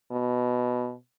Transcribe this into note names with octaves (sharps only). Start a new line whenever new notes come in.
B2